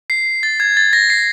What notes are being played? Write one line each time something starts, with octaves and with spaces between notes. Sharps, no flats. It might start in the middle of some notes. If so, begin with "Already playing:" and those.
C7
A6
G#6
A6
A#6
C7